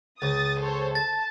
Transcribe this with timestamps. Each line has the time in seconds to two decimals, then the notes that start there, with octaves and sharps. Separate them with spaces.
0.22 C#2 D#6 A6
0.60 A4 C5 C#5
0.95 A5 A6